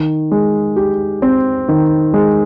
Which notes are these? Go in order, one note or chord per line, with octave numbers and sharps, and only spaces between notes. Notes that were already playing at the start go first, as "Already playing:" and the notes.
Already playing: D#3
G#3
G4
C4
D#3
G#3